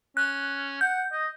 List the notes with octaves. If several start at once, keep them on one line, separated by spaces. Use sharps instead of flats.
C#4 F#6
F#5 G6
D#5